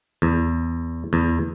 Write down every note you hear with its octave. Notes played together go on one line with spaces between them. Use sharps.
E2
E2